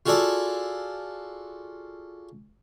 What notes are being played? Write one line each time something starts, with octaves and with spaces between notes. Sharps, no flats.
F4 F#4 G#4 A4 D5